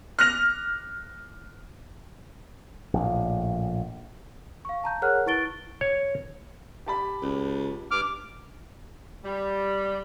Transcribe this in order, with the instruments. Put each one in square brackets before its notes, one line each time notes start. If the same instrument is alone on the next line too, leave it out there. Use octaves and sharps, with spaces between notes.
[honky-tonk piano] F6 F#6 A#6 F7
[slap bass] A#1 A2
[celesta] F5 C#6
A5 A#5 G6
G#4 A#4 C#5 F#5 F6 F#6
E4 B4 C#6 A6 D7 G7
[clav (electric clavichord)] C#5
[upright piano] G4 A5 B5
[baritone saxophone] C#2
[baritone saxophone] G2 [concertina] D6 F6
[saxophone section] G3